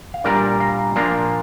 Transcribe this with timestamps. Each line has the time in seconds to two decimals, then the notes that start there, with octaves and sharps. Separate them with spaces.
0.14 F5
0.24 A#2 G3 D4 A#4 D5
0.60 F5 A#5
0.96 A#2 F3 A#3 D4 F5 A#5